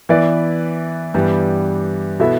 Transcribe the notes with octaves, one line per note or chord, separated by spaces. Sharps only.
E3 B3 E4 B4 D5
G2 E3 G3 B3
B2 B3 E4 A4 E5